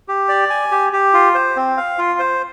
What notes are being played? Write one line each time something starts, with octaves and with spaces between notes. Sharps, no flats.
G4
D5
G#5
G4
G4
F4
C5
C4
F5
F4
C5